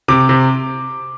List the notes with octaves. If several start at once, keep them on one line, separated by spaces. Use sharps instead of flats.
C3 D6
C3